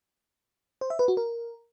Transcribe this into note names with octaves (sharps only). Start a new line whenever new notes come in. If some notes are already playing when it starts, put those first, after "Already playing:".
C5
E5
B4
F#4
A#4